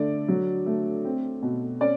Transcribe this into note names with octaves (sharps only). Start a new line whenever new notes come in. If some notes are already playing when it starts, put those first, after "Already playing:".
Already playing: D3 A3 D5
F#3
A3
C4
B2
C#4 D5